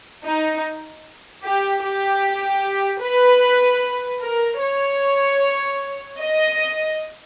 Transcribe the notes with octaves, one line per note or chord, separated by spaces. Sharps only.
D#4
G4
G4
B4
A#4
C#5
D#5